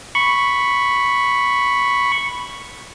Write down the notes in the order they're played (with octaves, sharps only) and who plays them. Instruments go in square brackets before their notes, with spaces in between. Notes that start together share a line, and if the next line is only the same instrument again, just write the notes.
[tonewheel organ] B5 C#6